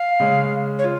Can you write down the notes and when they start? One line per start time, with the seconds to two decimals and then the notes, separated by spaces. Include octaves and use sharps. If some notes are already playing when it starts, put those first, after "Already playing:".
Already playing: F5
0.20 C#3 G#3 C#4
0.79 C#5
0.84 F4